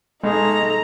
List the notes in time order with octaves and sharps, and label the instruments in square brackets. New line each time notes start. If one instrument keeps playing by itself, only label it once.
[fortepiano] B1 G#4 [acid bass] G#3 [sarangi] D#4 [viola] A4 A#5